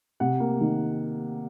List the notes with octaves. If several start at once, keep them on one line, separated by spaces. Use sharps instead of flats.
C3 F#5
A#3
D#3